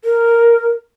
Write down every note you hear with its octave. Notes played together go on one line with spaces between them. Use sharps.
A#4